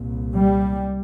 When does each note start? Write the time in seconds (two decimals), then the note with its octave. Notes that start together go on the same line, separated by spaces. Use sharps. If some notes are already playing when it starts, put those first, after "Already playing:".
Already playing: C2 A#2
0.34 G3